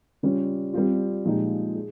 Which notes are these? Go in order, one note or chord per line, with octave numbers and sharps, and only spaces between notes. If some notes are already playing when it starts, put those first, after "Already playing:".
C#3 G3 C#4 F4
G3 C4 F4
A#2 F3 G#3 D#4 G4
G#4